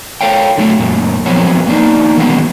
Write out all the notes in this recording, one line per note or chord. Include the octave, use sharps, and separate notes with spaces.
A4 C#5 F5 G5
D3 F#3 A3 E4
F#2 A#2
F3 F#3 B3 C4 C#5
A#3 D4 D#4
D#3 E3 F#3 G#3 B3 C#4